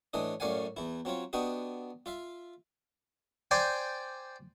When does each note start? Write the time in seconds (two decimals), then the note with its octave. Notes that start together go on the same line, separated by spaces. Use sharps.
0.13 A2 E3 D4 D#5
0.40 F#2 A2 D5 F5 F#5 G#5
0.77 E2 E4
1.05 F#3 C4 F4 C#5
1.33 B3 D4 F#4 G4 D#5
2.06 F4 E5 F5
3.51 C5 D5 G5 G#5